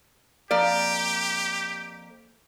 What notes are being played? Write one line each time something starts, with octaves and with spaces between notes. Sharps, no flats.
F2 A#3 G4 D5